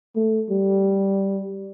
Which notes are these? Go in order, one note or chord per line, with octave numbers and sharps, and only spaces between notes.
A3
G3